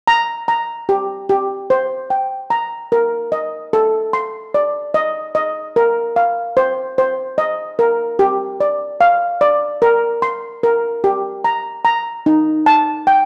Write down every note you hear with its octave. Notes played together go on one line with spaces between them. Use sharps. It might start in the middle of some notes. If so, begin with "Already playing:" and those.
A#5
A#5
G4
G4
C5
G5
A#5
A#4
D#5
A4
C6
D5
D#5
D#5
A#4
F5
C5
C5
D#5
A#4
G4
D5
F5
D5
A#4
C6
A#4
G4
A#5
A#5
D#4
A5
G5